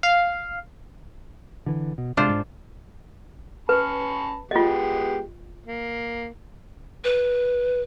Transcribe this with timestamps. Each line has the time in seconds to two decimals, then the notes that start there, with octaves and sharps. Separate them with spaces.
0.03 F5
1.66 D3 E3
1.98 B2
2.17 C3 G#3 D4 F4 C5
2.29 G#2
3.69 C#4 B4 A5 B5
4.51 G#3 B3 F4 G4 D#5
5.66 A#3
7.04 B4